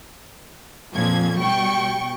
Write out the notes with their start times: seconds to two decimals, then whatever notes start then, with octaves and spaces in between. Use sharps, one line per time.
0.93 F2 A#2 F3 G#6
1.39 B2 G3 G5 C#6